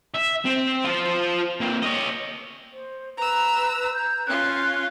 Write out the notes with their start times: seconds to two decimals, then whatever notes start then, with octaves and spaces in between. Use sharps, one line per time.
0.14 E5
0.45 C4
0.85 F4 C5
1.60 A#3 C4
1.82 C#5 D#5
2.73 C5
3.17 B4 A#5 E6
3.94 G6
4.26 C#4 F4 F#6